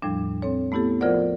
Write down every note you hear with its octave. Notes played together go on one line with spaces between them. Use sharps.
E2 A2 F3 G3 D4
C4 A4 C#5
A3 B3 E4 G4 A4
F3 F4 A#4 C5 D5 F#5